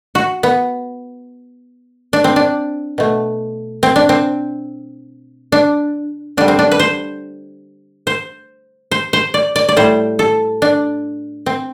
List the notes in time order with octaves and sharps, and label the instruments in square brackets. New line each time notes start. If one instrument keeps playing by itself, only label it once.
[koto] F#4
B3
D4
C4
D4
B2 A3
C4
D4
C4
D4
D3 G3 D4
C4
D4
B4
C5
C5
C5
C5
D5
D5
D5
A2 G3 C5
A4
D4
C4